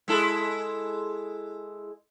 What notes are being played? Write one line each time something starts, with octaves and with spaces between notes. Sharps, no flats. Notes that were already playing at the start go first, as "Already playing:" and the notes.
G#3 E4 A4